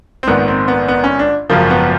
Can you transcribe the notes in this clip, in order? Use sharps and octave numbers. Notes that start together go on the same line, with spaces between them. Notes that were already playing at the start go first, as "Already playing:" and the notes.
C4
A#1 G#2 D#3 B3
C4
B3
B3
C#4
D4
G#1 F#2 C#3 F3 A#3
B3